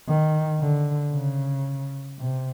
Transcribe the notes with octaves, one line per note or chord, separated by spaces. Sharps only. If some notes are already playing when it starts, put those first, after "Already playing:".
D#3
D3
C#3
C3